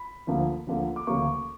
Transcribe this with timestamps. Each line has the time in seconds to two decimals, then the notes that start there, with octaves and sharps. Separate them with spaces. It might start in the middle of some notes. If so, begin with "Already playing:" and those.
Already playing: B5
0.27 D2 D3 F3 A#3
0.67 D2 D3 F3 A#3
0.96 D6
1.07 D2 C#3 F#3 A#3 C#6